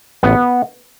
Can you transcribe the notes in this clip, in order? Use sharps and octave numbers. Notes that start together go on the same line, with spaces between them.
A1 B3